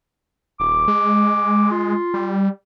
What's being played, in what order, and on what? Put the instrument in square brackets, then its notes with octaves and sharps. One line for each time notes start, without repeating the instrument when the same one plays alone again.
[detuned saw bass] D#1 [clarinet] D6
[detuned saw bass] G#3
[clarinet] F4
[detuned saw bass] G3